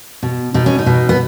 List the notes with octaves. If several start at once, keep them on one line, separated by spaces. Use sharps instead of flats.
B2
B2 D#4
C#4
D#4
B2
B3